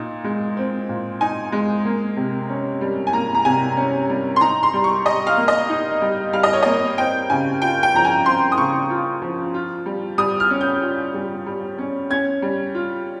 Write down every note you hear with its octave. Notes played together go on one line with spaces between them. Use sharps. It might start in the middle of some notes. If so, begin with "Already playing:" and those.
Already playing: A#2 D#4
G#3
C4
A#2
D#4 G#5
G#3
A#3
C3
C#4
G3
G#5
A#3 A#5
A#5
C3 G#5
C#4
G3
C6
D#4 A#5
C6
G3
C#6
G3 D#5
F5
A#3
D#5
D#4
G3
G3 F5
D#5
C#5
A#3 D#5
C4 G5
C#3 G#5
F4 G5
G5
F3 A#5
G#5
C4 C6
D#6
C#3 C#6
F4
F3
F4
G3
G3 D#6
F6
C#4
G6
F4
G3
G3
C#4
C#4 G#6
G3
F4